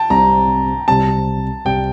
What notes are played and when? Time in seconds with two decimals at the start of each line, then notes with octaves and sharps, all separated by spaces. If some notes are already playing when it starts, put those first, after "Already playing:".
Already playing: G5 A5
0.10 C2 C3 G3 C4 A#5
0.88 C2 C3 G3 C4 A5
1.65 C2 C3 G3 C4 G5